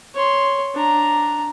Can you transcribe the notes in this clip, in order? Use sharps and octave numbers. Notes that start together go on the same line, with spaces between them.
C#5 C6
D4 A#5